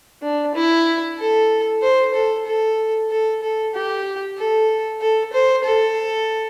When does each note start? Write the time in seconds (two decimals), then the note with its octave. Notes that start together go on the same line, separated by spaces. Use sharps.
0.22 D4
0.55 E4
1.18 A4
1.82 C5
2.14 A4
2.46 A4
3.10 A4
3.42 A4
3.74 G4
4.38 A4
5.01 A4
5.33 C5
5.64 A4